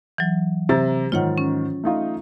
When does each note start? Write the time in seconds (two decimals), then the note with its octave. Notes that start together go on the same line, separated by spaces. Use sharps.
0.18 E3 F#3
0.69 C3 A#5 A6
1.12 G#2 D#3 F4 C#5 F#5
1.38 C#4
1.84 A3 D#4 F4